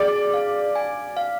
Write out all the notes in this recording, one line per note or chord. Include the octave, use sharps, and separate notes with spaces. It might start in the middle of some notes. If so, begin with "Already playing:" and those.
Already playing: G#4 D5
F5
G#5
F5